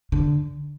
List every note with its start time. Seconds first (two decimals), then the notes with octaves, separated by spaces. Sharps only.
0.12 D3